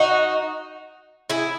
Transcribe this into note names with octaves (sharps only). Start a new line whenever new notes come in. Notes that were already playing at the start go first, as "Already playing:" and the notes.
Already playing: D#4 F#4
E4 G#4